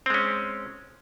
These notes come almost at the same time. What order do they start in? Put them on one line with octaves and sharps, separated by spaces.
C4 G#3 C#4